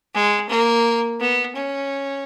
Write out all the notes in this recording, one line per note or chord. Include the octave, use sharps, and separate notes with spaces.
G#3
A#3
B3
C#4